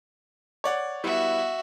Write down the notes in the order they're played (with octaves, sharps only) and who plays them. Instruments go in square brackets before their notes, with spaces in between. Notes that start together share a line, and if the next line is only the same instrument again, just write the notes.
[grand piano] C#5 D5 F#5
[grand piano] G3 B3 E4 [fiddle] F#4 E5